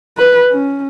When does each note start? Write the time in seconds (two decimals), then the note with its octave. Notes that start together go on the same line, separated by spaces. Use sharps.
0.18 B4
0.51 C#4